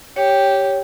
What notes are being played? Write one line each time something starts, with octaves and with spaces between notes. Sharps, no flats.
G4 C#5